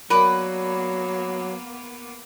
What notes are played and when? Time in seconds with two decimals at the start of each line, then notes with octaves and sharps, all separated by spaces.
0.10 F#3 A#3 B3 A#4 B4 D5